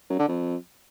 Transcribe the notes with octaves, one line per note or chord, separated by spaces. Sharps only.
F#2
D3
F2